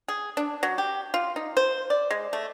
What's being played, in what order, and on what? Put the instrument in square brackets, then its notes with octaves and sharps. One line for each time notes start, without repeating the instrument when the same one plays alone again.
[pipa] G#4
D4
F#3
G4
F4
D#4
C5
D5
G#3
A3